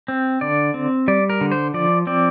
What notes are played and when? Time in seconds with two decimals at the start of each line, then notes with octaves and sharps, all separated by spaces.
0.08 C4
0.41 D3 D5
0.74 C4
1.08 G3 D5
1.30 A#4
1.41 D3
1.52 C5
1.74 F3 D5
2.07 C4 D5